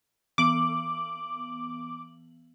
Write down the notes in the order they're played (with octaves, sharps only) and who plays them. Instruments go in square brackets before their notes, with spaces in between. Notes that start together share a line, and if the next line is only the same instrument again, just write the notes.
[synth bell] E3 B3 F#7 [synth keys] D6